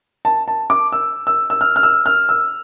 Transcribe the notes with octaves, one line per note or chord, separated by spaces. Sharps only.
A5
A5
D6
E6
E6
E6
F6
F6
E6
F6
E6